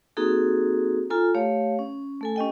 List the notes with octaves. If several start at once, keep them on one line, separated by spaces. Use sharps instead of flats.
A#3 C4 D#4 F#4 G#4 A4
F4 A4 G#5 A#5
A3 G4 C#5 F5
C#4
A3 A4 G#5
C#4 G4 D#5 G5